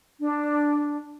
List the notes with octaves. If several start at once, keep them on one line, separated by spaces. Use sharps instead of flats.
D4